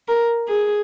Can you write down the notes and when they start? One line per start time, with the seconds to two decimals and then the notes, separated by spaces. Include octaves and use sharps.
0.08 A#4
0.48 G#4